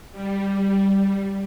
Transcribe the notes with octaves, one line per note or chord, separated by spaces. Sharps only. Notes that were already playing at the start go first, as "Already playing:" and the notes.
G3